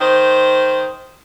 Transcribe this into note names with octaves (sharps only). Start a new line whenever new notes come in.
D#3 C5